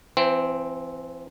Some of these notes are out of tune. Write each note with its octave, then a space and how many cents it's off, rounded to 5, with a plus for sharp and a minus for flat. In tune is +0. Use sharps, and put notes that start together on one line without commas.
E3 +35 C4 +0